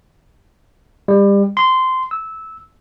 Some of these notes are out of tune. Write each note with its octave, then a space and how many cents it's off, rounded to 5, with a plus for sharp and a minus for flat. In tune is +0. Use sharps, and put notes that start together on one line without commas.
G3 +30
C6 -15
E6 -15